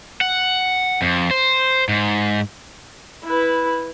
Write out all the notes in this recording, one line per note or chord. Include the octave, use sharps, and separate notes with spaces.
F#5
F2
C5
G#2
E4 B4